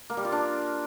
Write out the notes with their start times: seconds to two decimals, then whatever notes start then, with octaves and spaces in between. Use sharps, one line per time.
0.10 A#3
0.17 G3
0.25 F4
0.32 D4